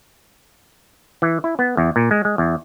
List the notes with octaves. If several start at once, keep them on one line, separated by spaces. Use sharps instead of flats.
E3
E4
B3
E2
A#2
G#3
G#3
E2